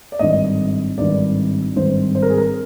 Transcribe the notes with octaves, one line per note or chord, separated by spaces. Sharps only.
D5
G#1 G2 D#3 D#5
G#1 G2 D#3 D5
G#1 G2 D#3 C5
C5
A#4
G#4
A#4